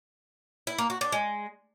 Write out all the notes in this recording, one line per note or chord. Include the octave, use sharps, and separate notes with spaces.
E4
A#3
F#4
D4
G#3